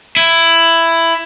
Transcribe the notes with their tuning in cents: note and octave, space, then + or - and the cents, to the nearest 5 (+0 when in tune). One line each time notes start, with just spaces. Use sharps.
E4 +10